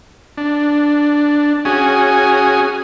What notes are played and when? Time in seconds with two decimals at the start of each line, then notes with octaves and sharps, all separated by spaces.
0.38 D4
1.65 C#4 F#4 G#4 G#5